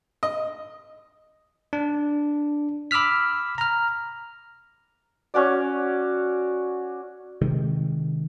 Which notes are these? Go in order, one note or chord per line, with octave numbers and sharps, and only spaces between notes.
D#5
D4
B5 D6 E6 F6 B6
A#5 F6
C#4 F#4 D5
C3 D#3 G#3